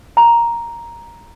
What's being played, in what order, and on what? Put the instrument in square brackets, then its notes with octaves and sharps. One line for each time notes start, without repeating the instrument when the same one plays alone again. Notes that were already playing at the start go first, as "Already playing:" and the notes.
[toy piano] A#5